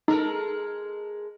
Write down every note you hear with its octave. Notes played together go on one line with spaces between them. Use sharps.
G#3 D#4 A4 A#4